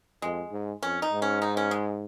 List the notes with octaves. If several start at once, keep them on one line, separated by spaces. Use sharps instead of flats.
F2 G#3
G#2
F2 C#4
D#4
G#2
C#4
D#4
C#4
G#3